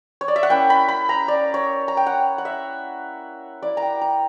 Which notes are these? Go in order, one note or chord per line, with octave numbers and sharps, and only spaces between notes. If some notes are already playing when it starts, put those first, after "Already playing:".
C#5
D5
E5
F#5
A#3 C#4 E4 G5
B5
B5
A#5
D5
C#5
A#5
G5
F#5
F#5
E5
A#3 E4 D5
G5 A#5
A#5